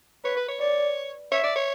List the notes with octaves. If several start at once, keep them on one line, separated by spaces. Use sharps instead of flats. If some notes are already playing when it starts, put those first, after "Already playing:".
B4 C#5
B4
C#5
C#5 D5
C#5 E5
D5
C#5